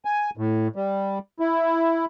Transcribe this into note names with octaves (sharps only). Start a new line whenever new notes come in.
G#5
A2
G3
E4